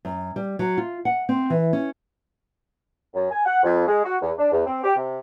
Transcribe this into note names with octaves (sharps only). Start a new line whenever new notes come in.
F#2
G3
F#3
F4
F#5
C4
E3
C#4
F#2
G#5
F#5
F2
G#3
F#4
E2
D4
E2
C4
G4
C3